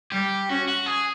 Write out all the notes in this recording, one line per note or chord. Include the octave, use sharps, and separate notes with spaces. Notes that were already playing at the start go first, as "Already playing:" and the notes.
G3 G4
C#4 F#4
F#4
G#4